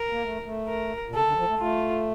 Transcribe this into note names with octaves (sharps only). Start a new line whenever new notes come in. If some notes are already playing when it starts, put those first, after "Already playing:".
Already playing: A#4
A#3
A3
A3
A#4
A#2
C#3 A4
D3
F3
A3
A3 F4